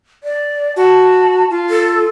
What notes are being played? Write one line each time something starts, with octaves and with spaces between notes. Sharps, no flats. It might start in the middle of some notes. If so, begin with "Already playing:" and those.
D5
F#4 A5
F4
A4